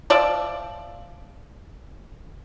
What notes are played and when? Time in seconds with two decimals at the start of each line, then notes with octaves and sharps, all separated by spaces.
0.10 F3 D5 E5